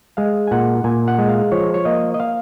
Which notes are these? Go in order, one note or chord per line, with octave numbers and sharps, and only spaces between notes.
G#3 F5
G#5
A#2 F#5
A#2 G#5
F#5
G#3
F5
F3 C#5
C#5
A#3 D#5
D#5
F5